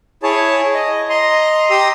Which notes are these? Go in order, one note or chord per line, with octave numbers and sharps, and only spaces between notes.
E4 G#4 C#5 A5
D#5
D#5 A#5 C6
G4 A#5 C6 D#6 E6